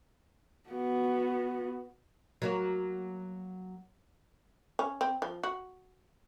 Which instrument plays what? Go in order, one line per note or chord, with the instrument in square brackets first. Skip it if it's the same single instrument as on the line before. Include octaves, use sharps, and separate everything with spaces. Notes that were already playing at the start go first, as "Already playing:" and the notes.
[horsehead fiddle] B3 F#4
[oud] F#3 A#3 F#4
[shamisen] C#4
C4
F3
F#4